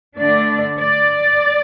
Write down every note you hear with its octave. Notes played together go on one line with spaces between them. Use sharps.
D3 A3 D4 D5
D5